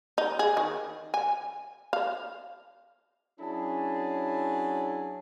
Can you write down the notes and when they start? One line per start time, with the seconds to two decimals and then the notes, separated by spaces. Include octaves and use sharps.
0.18 D#4
0.39 G#4
0.57 D#3
1.14 G#5
1.93 F5
3.40 F#3 C#4 D4 E4 G#4 A5